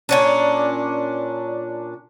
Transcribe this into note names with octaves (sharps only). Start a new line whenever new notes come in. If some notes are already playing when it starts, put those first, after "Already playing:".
A#2 C#4 D4